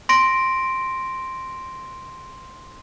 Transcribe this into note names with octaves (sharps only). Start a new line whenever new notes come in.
C6 A#6 D7